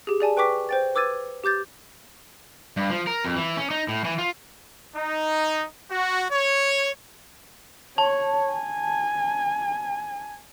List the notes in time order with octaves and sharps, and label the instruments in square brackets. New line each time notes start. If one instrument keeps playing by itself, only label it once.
[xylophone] G4 G#4
G#4 D5 G#5 A5
B4 G5 C#6 D6 B6
C5 G5 A6
B4 D6 E6 G#6 A6 D#7
G4 D6 G6 A6
[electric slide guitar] G2
F3
A#4
F2
E3
C#4
D#4
A2
E3
F4
[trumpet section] D#4
F#4
C#5
[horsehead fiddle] C#5 [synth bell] A5
[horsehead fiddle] G#5